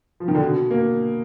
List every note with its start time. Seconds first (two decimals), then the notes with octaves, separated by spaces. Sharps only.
0.20 F3
0.28 D#3
0.35 D3
0.42 B2
0.71 A#3